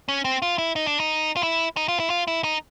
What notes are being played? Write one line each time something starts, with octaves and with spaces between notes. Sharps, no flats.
C#4
C4
F4
E4
D#4
D4
D#4
F4
E4
D#4
F4
E4
F4
E4
D#4